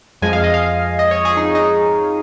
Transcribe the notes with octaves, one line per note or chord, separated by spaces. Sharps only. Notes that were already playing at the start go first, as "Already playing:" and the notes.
F2 F3 G#3 G#5
F5
D#5
F5
D#5
C#5
G#4
D#4
D#4